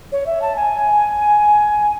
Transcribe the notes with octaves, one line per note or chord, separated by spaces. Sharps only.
C#5
E5
A5
G#5